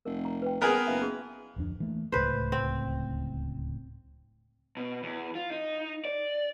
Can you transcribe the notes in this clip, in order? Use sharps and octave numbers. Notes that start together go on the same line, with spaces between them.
F1 A#4
A#5
B4 G5
D#1 B3 G#4 A#4 D#5 A5
F#1 F4 E5 F5
F#4 G#4
D1 F2 D4
E3 A3 A#3
D1 C#2 A2 B4 C5
C4
B2
E2
F4
D#4
D5